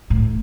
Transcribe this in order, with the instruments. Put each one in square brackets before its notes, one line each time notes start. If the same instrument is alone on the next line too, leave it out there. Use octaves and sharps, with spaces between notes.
[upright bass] A2